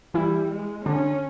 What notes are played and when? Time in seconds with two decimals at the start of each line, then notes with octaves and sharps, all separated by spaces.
0.14 E3 G3 E4
0.51 G#3
0.85 D3 C#4 D4